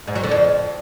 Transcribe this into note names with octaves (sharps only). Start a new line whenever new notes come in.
G#2
F#3
D3
F2